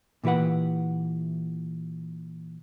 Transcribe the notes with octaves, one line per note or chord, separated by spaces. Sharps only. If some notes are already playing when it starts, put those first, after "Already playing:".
A#2 E3 G4 B4 F#5